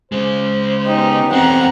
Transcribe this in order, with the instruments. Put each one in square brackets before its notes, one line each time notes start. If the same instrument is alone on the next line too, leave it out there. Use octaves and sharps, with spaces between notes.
[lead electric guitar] C#3 G#3 [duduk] C5
[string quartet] B3 C#4 G4 [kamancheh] D#4
[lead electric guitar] E2 C4 [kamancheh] F#5 A#5